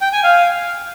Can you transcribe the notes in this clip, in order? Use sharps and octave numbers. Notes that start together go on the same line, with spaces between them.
G5
G#5
F5